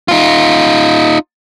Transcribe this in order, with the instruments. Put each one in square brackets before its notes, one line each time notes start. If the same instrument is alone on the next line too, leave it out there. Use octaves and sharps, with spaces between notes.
[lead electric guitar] D#4 F4